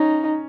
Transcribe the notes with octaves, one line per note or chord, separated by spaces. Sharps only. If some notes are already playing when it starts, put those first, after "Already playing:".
Already playing: C#4 D#4